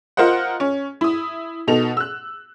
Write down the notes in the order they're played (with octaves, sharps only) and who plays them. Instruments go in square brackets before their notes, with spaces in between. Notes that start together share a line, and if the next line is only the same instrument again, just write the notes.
[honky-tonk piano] F4 A#4 C5 D#5 F#5
C#4
E4 D#6
B2 D#4 A4 F7
E6 F#6